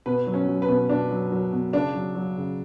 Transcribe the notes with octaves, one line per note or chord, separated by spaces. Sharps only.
B2 B4
F#3
C#4
F#3
B4
B2
B2 D4
F#3
F#3
B2
C#3 D4
F#3
F#3
C#3